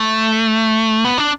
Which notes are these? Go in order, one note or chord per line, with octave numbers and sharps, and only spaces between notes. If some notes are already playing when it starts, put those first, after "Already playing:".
Already playing: A3
B3
D4